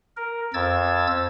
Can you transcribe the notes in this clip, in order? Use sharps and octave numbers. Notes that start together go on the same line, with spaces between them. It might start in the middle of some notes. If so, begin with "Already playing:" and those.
A#4
F2 E6 G#6 A6